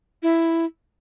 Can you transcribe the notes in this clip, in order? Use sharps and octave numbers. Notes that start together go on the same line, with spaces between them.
E4